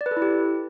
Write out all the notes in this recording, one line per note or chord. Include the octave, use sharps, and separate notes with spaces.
D5
B4
A4
E4
G4